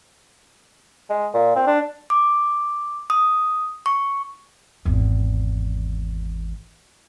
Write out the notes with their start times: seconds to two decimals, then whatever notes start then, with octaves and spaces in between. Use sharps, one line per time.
1.10 G#3
1.33 A#2
1.56 C4
1.67 D4
2.10 D6
3.10 D#6
3.86 C#6
4.85 G#1 E2